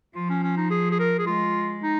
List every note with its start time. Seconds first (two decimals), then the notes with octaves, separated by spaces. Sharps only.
0.15 F3 F4
0.29 C#4
0.43 C#4
0.57 D#4
0.70 G#4
0.91 G#4
0.99 A#4
1.19 G#4
1.26 G#3 F4
1.83 D#4